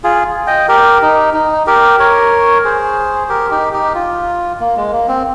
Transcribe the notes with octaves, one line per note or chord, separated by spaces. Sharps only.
F4 G#4
D#5 G5
G4 A#4
D#4
D#4
G4 A#4
A#4 C#5
G#4 C5
G4 A#4
D#4 G4
D#4 G4
F4
A#3
G#3
A#3
C4